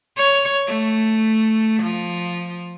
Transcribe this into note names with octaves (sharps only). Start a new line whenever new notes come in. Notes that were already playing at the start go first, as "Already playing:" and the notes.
C#5
A3
F3